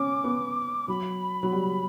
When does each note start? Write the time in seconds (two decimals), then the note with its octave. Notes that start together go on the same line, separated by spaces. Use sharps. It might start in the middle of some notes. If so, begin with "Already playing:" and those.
Already playing: C#4 D6
0.24 B3
0.88 F#3 B5
1.43 F#3
1.52 G3